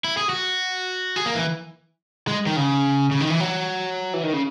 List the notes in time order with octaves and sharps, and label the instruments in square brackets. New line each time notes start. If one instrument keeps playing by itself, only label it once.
[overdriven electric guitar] E4
G#4
F#4
G#4
A#3
E3
G#3
D#3
C#3
C#3
D#3
E3
F#3
E3
D#3
C#3